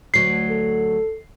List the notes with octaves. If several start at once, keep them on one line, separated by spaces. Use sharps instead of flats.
D2 F#3 C7
A4